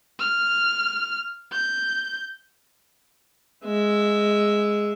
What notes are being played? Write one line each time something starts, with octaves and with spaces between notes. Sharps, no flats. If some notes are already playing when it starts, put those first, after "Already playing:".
F6
G6
G#3 E5